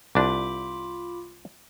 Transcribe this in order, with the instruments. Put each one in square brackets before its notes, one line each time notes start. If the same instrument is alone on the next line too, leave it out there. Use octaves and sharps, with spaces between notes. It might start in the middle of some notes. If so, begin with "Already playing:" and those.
[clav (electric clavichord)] C2 D4 [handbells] F4 B5 D6